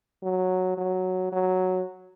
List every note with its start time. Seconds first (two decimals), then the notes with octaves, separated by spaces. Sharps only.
0.23 F#3
0.77 F#3
1.32 F#3